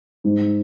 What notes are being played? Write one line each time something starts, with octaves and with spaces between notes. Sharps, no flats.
G#2